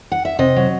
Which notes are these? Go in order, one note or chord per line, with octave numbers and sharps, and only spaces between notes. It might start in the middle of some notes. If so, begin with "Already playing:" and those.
F#5
E5
C3 D#5
F#3